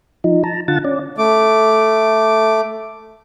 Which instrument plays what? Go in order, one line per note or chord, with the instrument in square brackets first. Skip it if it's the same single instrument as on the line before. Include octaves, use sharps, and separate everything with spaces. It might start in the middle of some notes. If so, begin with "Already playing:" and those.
[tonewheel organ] F3 D#4
A5 A#5
D3 F4 F#5 A5 A6
C#4 D5
[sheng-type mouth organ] A3 D6